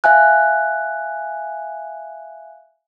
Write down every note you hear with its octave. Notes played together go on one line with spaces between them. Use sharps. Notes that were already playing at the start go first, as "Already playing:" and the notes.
E5 F5 G#5 F#6